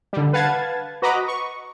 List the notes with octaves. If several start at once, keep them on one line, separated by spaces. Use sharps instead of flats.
D3 G3
B4 F5 F#5 A5 G#6 A6
F#4 B4 D#5 A#5 B5 D6
C#6